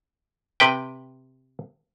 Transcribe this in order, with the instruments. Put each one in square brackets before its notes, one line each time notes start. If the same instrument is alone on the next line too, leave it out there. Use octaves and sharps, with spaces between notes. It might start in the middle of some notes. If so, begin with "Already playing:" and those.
[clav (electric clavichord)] C3 B4 G5